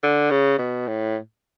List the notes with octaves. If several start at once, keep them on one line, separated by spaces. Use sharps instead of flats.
D3
C#3
B2
A2